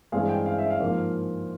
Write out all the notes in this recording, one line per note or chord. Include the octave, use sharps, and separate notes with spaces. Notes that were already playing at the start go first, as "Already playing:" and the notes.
G2 E3 G#3 C4 F5
G5
F5
E5
F5
G#2 F3 A#3